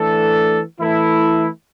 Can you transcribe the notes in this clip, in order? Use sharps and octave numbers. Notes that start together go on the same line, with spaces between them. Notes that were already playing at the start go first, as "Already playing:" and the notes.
Already playing: E3 A3 D4 A4
E3 A3 E4 A4